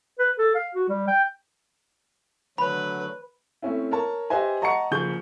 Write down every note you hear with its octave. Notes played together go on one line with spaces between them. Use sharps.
B4
A4
F5
F#4
G3
G5
D3 F#3 A3 B4 B5
A3 C4 C#4 E4
A#4 C#5 A5
G4 B4 C5 D#5 E5 G#5
D#5 F#5 A5 A#5 C#6 C#7
F#1 F3 G#4 C#6 G6 G7